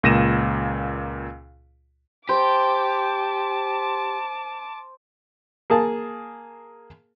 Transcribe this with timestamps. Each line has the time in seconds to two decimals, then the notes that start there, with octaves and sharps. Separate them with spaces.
0.03 C#2 A#2 A#6 D#7 E7
2.29 G4 C5 A5 D6
5.70 A#3 G#4 A5